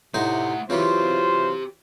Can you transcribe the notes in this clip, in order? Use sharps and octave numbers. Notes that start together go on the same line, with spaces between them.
A2 C3 A3 D#4 C5 F#5
C#3 E3 F#3 C4 F4 G4 C5